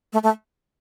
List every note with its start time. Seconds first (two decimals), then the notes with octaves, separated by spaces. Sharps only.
0.13 A3
0.23 A3